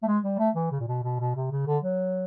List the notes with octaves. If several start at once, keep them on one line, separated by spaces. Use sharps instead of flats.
A3
G#3
G3
A3
E3
C#3
A#2
B2
B2
B2
C3
C#3
D3
F#3